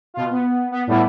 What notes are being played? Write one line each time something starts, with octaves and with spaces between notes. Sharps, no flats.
B2 F4
B3
B3
A2 G3 A3 B3 E4